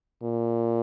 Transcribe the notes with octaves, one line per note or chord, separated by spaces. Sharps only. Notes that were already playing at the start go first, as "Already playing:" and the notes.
A#2